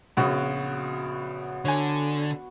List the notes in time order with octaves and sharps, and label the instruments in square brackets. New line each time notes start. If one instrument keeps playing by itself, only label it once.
[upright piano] A#1 C#3 [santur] B3 F#4
[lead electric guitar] D3 [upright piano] C#5 G#5